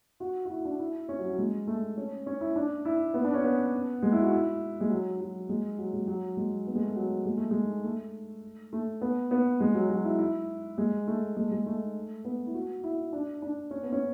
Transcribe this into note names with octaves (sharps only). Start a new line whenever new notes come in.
F#4
F#4
E4
D4
E4
C#4
F#3
F#3
G#3
A3
C#4
C#4
E4
D4
E4
B3
D4
C#4
B3
G#3
E4
F#4
E4
G#3
F#3
F#3
G#3
F#3
G#3
F#3
G#3
B3
G#3
A3
F#3
G#3
A3
G#3
A3
A3
B3
B3
G#3
F#3
F#3
E4
E4
G#3
A3
G#3
G#3
A3
B3
E4
F#4
E4
D4
D4
C#4
B3
C#4